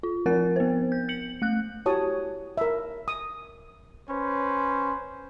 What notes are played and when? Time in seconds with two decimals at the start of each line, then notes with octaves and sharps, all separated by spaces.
0.03 F4
0.26 F3 C4 A#4 F#5 A6
0.56 B3 C5
0.92 G6
1.09 G6 C#7 F#7
1.42 A3 F#6
1.85 E4 F#4 G4 C#5 A5 D#6
2.57 A#4 E5
3.08 D#6
4.09 C#4 B4 C5